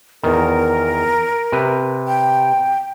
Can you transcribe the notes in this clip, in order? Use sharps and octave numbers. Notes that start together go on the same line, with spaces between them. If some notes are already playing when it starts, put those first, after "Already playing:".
E2 D#3 A#4
C3 B4
G5